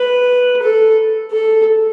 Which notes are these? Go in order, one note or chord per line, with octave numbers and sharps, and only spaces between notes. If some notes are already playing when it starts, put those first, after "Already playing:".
Already playing: B4
A4
A4